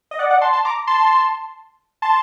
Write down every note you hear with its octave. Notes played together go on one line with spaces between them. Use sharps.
D#5
D5 F#5
D5 F#5
A5 C6
A5 C6
A#5 D6
A5 C6
A5 C6